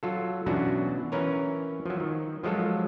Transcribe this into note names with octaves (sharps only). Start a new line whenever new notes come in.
F#3 F4 A4
B2 E3 F#3 C#4 D4 F#4
E3 C#4 A#4 B4 C#5
F3 F#3
D#3
F3 F#3 G#3 F4 A4